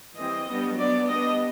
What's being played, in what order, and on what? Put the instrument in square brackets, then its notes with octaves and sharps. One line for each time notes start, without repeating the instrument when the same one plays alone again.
[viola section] E3 G3 C4 D#5
G3 B3 D4
F#3 B3 D4 D5
G3 B3 D4 D#5